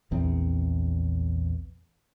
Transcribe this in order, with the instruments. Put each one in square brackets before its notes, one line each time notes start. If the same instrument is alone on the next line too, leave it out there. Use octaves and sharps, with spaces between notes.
[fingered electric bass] A#1 E2 C4